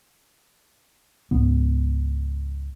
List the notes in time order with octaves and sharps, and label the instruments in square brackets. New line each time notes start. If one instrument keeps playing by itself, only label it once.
[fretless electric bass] C#2 G#2 B3